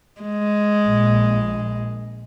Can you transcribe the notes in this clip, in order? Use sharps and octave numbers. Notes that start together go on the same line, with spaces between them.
G#3
A#1